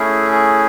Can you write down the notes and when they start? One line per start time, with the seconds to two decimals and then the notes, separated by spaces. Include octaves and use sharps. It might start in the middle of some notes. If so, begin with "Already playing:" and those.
Already playing: A3 C#4 E4 G#4
0.32 G#4